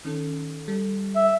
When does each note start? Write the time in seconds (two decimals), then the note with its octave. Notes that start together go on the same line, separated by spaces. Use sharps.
0.05 D#3 C#4 A4
0.68 G3 A4
1.16 E5